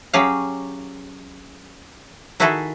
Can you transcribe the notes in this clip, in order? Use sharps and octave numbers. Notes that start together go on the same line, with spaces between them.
F#3 C#4 G4 G#4 C#5 F5
D#3 E4 F#4 G#4 A4 E5